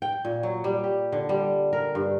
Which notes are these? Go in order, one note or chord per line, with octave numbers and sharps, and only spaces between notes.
G5
A#2
F#3
G3
G4
D3
G3
A#4
G2